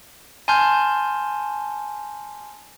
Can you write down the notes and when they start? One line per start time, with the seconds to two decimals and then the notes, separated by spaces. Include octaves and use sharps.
0.48 G#5 A5 C6 F6 G6